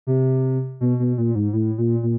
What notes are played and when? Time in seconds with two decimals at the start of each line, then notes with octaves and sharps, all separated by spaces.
0.07 C3
0.81 B2
0.99 B2
1.18 A#2
1.35 G#2
1.53 A2
1.78 A#2
2.03 A#2